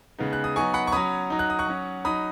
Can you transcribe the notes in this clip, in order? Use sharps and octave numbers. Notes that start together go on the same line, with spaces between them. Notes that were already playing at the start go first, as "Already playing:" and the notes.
C#3 G#3 B3 D#4
F#6
D#6
F#3 B3 D#4 G#5 C#6
F#5 B5
C#6
F#3 C#4 B5 D#6
F#3 D#4
F#6
D#6
C#6 F#6
F#3 C#4
F#3 D#4 B5 D#6